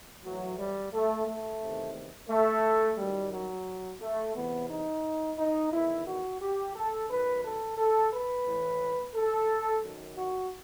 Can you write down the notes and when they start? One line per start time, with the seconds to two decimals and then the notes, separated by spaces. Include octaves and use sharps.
0.24 A2 E3 F#3
0.59 G3
0.93 A3
1.27 A3
1.61 E2 C3 D#3
2.29 A3
2.98 F#2 D#3 G3
3.33 F#3
4.01 A3
4.35 E2 C3 E3 B3
4.70 D#4
5.38 D#4
5.72 E2 D#3 E4
6.06 F#4
6.41 G4
6.76 A4
7.09 F#2 D#3 B4
7.44 A4
7.78 A4
8.12 B4
8.47 A2 E3
9.15 A4
9.83 F#2 D#3
10.18 F#4